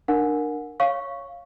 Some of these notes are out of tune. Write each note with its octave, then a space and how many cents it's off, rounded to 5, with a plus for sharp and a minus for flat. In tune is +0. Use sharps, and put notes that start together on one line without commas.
D4 +25 A#4 +0 F#5 -30
C#5 +0 F5 +0 C#6 +0